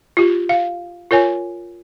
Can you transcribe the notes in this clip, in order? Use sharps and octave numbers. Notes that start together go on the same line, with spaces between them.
F4 G4
F5
F4 A#4 C#5 G#5